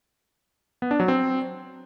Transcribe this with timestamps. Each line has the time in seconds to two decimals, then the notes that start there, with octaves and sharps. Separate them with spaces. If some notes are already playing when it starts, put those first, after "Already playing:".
0.82 B3
0.91 D4
1.00 F#3
1.08 C4